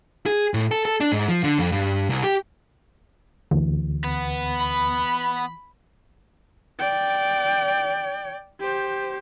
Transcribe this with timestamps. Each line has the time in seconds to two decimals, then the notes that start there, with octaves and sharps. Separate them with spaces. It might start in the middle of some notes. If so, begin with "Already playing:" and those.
0.26 G#4
0.54 A2
0.71 A4
0.85 A4
1.00 D4
1.12 G#2
1.28 F3
1.44 D3
1.58 F2
1.72 G2
2.09 C2
2.23 G4
3.51 D2 E3
4.04 B3
4.59 B5
6.79 D5 G5
8.60 G4 C5